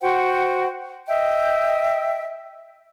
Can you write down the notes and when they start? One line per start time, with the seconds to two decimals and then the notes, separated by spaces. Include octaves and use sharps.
0.01 F#4 C5 F#5 G5
1.08 D#5 E5 G5